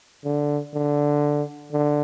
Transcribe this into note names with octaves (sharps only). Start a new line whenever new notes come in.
D3
D3
D3